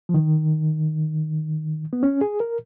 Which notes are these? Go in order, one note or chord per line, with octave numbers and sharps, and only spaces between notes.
F3
D#3
B3
C#4
G#4
A#4